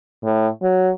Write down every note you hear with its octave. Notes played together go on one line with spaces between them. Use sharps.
A2
F#3